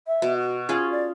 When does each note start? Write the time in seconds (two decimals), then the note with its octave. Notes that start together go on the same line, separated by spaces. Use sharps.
0.07 E5
0.22 B2
0.36 F#4
0.69 C#4 F4 G#4
0.91 D5